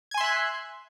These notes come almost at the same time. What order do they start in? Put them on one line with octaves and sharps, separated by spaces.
G#6 G#5 C6 E5 F#6